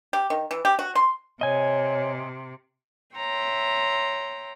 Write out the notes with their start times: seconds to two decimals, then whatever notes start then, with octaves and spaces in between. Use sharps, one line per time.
0.13 G4
0.30 D#3
0.51 E3
0.65 G4
0.79 F#4
0.95 C6
1.41 C3 C#5 D#5 G#5
3.17 C#5 E5 G5 A#5 C6